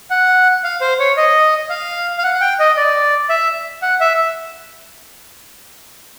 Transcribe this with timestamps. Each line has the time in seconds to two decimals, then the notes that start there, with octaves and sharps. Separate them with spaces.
0.11 F#5
0.64 F5
0.81 C5
0.99 C#5
1.17 D#5
1.70 F5
2.18 F5
2.24 F#5
2.34 F#5
2.41 G5
2.59 D#5
2.77 D5
3.29 E5
3.82 F#5
4.01 E5